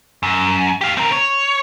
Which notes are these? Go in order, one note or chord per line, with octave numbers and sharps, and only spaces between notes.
F#2
G4 F5
C4 A#4
C#5